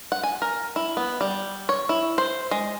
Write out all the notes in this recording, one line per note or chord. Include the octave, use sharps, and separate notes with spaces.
F#5
G#5
A#4
E4
B3
G3
C#5
E4
C5
G#3